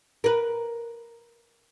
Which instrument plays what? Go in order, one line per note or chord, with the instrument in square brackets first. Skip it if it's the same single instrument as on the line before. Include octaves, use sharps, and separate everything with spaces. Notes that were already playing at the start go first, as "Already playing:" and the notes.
[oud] A#4 B4